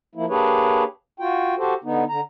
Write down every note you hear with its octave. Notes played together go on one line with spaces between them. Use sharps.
F3 A#3 E4
A#3 D4 G4 G#4 B4 C#5
F4 F#4 G5
F#4 G4 A4 C5
D3 B3 D#4
D3 A#5